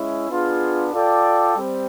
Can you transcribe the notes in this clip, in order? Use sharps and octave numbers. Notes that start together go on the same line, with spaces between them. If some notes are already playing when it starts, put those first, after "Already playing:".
Already playing: G#3 C#4 E4
B3 D4 F4 G#4
F4 A4 D5 G5
G3 C4